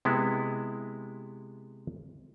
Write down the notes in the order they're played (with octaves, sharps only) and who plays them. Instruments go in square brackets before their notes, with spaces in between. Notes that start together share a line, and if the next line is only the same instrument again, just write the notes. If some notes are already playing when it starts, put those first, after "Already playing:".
[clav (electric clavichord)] C3 G#3 B3 E4